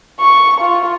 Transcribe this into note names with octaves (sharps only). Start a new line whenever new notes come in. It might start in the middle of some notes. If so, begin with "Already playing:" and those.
C#6
F4